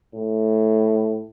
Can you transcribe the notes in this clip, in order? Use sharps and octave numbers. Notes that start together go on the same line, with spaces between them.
A2